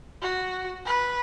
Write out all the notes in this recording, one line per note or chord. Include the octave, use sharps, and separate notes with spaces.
F#4
B4